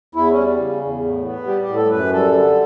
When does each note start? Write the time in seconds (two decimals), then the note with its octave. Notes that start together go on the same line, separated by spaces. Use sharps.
0.15 E2 E4
0.30 C#4
0.37 G3
0.59 C#3
0.81 E2
1.03 A2
1.24 B3
1.47 G3 G4
1.62 G4
1.69 A2
1.76 A4
1.90 F#2 B4
2.13 G3 A4
2.34 D3